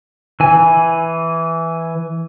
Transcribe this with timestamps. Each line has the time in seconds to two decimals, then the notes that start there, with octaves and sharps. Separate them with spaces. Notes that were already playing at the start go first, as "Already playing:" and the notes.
0.40 E3 G#5